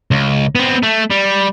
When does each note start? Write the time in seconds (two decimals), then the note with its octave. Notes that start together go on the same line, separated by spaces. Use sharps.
0.11 C#2
0.55 B3 C4
0.83 A3
1.10 G3